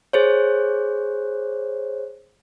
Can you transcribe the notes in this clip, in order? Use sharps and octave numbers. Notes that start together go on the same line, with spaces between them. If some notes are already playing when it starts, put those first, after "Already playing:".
G#4 C5 C#5